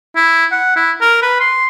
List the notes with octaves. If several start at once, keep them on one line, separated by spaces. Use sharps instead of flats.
E4
F#5
E4
A#4
B4
C6